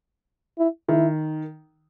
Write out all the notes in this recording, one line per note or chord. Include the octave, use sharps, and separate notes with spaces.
E4
D#3 E4